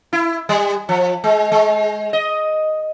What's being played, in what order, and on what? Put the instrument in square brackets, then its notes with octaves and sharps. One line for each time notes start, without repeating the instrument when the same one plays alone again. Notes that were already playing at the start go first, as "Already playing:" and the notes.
[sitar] E4
G3
F3
G#3
G#3
D#5